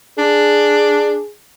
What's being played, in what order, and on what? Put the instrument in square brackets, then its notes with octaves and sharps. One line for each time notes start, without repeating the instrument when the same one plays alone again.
[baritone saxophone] D4 [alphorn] G#4